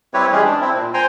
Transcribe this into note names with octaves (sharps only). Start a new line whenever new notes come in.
G3 C4 E4 G4 B4 C#5
E3 G3 G#3 C#4 G4 G#4
D4
C4 E4
A#2
C5 G5 G#5 A#5 C6